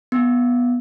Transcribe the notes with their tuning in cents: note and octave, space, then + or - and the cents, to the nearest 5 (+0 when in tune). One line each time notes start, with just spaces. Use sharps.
B3 -10